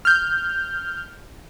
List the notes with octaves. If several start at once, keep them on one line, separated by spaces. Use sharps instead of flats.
F6 G6